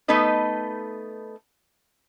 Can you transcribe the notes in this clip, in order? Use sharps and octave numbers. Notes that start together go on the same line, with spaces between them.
A3 B3 D#4 A4 B4 D#5